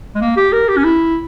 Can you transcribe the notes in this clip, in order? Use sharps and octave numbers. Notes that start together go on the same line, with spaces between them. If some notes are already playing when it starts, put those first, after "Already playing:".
G#3
A#3
G4
A#4
G4
C#4
E4